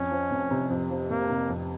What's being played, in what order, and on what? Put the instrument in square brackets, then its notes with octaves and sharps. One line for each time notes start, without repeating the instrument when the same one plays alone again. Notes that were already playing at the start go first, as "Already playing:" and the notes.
Already playing: [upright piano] F2 [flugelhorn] C#4
[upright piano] F3
F1
C3
F2
F3
[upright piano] F1 [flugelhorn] A#3
[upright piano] C3
F2